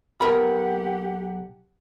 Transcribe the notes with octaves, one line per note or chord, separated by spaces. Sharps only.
B1 G4 A#4 F#5 B5